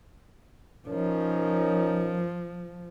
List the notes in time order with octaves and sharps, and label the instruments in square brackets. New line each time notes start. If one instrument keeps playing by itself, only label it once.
[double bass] F3 [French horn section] C#4 A#4 [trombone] D#4